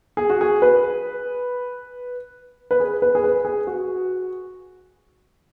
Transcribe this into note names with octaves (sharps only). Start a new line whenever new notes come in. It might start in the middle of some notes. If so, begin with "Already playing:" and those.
G#4
F#4
G#4
B4
B4
G#4
B4
G#4
B4
G#4
F#4